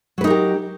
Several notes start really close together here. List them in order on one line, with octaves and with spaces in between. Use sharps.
F#3 B4 D#4 A#4 G4